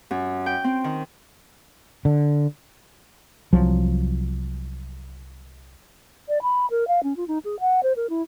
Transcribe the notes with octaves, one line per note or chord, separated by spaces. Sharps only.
F#2
G5
C4
D#3
D3
C2 F3 F#3
D5
B5
A#4
F5
C#4
F4
D#4
G#4
F#5
C5
A#4
E4